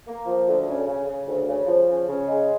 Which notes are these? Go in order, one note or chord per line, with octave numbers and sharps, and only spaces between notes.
A#3
F3
D2
C#3
C#3
C#3
D2
C#3
F3
C#3
C#3
G#3